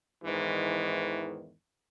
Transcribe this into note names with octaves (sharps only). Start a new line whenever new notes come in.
E2 G#2 D#3 E3